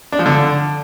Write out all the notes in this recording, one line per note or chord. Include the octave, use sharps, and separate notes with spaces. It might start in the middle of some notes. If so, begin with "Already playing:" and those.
D4
F3
D3